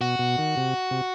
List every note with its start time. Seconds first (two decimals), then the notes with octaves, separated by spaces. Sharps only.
0.01 B2 F#4
0.19 B2
0.38 D#3
0.57 C3
0.91 C3